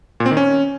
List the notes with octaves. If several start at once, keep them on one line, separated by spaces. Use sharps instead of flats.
A#2
C4
D#3
C#4